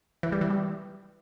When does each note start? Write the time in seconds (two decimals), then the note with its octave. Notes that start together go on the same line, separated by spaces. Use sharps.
0.23 E3
0.32 G3
0.41 E3
0.50 G3